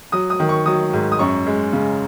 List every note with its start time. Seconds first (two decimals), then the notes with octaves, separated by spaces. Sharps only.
0.12 F#3 D#6
0.30 D#6
0.40 D#3
0.49 C#6
0.66 F#3 D#6
0.93 G#2
1.12 D#6
1.19 F#2 C#6
1.47 G#3
1.73 C#3